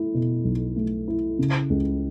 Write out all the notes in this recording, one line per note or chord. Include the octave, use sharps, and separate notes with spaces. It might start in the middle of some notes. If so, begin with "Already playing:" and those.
Already playing: A3 E4
B2
B1
A3
E4
C#3
C#2